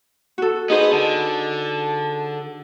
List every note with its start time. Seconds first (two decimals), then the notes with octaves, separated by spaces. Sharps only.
0.38 F#4 A4
0.70 B3 D#4 G#4 C5 D#5
0.93 D3 A5